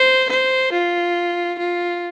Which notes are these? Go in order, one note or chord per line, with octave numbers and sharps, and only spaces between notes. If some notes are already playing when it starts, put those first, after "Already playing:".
Already playing: C5
C5
F4
F4